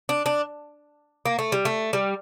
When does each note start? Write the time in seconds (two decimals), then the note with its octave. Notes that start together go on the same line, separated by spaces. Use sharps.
0.09 D4
0.26 D4
1.26 A#3
1.39 A3
1.52 G3
1.65 A3
1.93 G3